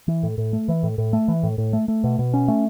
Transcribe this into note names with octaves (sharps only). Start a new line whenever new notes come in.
E3
A2
A2
A3
E3
A2
A2
A3
E3
A2
A2
A3
A3
B2
B2
C#4
A3